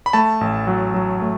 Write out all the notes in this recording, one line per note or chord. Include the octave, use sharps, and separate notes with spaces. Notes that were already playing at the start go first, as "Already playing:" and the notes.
B5
A3 A5
A1
F#3
F#3
A3